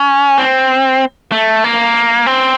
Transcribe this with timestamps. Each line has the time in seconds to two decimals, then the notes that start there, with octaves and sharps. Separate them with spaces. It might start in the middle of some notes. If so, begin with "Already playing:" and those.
Already playing: C#4
0.38 C4
1.32 A3
1.64 A#3
2.26 C4